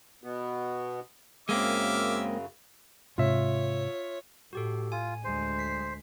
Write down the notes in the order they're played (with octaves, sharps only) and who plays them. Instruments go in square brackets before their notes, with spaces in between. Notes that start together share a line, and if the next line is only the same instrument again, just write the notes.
[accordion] B2 B3
[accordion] F#2 C#3 [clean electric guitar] G#3 A#3 C4 [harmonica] E5 D6 F6
[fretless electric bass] G#2 C3 [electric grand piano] F4 E5 [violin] C#5
[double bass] A2 [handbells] F#4 G4 A4
[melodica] F4 [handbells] G#5
[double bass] D2 G#3 [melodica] C5
[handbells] B6 C7